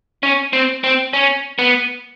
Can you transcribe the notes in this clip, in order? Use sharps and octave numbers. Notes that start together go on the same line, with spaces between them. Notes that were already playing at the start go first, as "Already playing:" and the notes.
C#4
C4
C4
C#4
B3